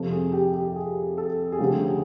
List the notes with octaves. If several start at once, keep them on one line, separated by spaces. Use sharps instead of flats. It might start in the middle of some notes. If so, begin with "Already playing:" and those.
Already playing: F2 C3 F3 A4
G#4
G4
G4
G#4
A4
G#4
D2 C#3 F3 A3 G4
G#4